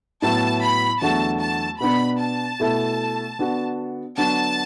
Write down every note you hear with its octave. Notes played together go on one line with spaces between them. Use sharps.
A2 F#3 B3 E4 B4 A5
B5
E2 D3 F#3 A3 F#4 A5
A5
B2 B3 D4 B5
A5
B2 A3 E4 A4
D3 B3 D4 F#4
D3 F#3 B3 D4 F#4 A5